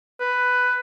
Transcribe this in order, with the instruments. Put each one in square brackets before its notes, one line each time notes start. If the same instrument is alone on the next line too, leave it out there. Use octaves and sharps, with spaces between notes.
[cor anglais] B4